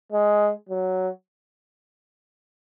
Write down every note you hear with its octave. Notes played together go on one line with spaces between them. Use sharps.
G#3
F#3